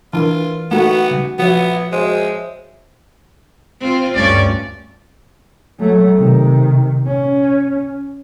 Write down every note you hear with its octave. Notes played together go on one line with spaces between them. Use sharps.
E3 D4 F4 A#4
A3 B3 D#4 F#4
C#3 G3
F3 B3 F#4 C#5 E5
G#3 C5
C4 F4
D2 G2 C#4 D5
F#3 A3
C3 D#3
C#4